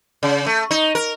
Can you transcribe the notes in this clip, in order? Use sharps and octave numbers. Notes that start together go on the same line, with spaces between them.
C#3
A3
D#4
A#4